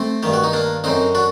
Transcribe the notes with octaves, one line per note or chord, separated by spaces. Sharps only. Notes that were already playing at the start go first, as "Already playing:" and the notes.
Already playing: A3 C4
G2 D#3 G4
F#4
D#4
A#3 D4
F#2 D3 C4 D#4
D4 F#4